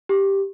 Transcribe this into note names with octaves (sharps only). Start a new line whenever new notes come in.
G4